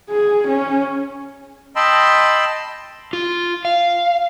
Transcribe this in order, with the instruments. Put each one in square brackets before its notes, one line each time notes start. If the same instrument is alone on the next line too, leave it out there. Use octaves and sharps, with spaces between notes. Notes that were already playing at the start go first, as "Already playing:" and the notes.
[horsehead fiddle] G#4
C#4
[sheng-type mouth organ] D#5 G5 A5 B5 C6 E6
[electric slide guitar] F4
F5